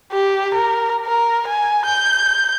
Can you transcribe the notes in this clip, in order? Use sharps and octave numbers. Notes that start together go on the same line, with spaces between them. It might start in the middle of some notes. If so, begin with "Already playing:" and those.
G4
A#4
A#4
G#5
G6